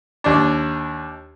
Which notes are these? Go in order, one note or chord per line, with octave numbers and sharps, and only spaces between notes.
D#2 D4